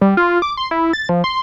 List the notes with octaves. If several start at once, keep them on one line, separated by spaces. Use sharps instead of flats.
G3
F4
D6
C6
E4
A6
F3
C6